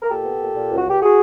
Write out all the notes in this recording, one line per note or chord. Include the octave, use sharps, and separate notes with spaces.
A#4
A#2 G4 A4
B3
A#2
A#2
C#2
F#4
C#2 G4
F#4 G#4